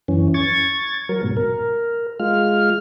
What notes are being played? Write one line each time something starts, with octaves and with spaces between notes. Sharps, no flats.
F#2 E3 C#4
C#6 G#6 A6
F#3 A#4
G#2 B2
A#4
G#3 F4 F6